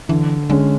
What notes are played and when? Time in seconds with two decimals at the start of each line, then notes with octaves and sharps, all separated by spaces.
0.09 D3 E3
0.50 D3 G#3 C#4 G#4